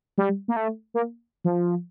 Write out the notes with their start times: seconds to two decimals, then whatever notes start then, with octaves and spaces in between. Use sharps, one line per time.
0.18 G3
0.48 A#3
0.56 A3
0.94 A#3
1.44 F3